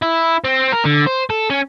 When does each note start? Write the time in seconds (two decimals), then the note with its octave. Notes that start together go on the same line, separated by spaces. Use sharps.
0.02 E4
0.44 C4
0.72 A#4
0.85 D3
1.07 C5
1.30 A4
1.50 C#4